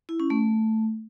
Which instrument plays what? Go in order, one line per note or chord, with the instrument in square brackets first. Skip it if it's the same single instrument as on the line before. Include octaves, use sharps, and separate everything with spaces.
[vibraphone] E4
C#4
A3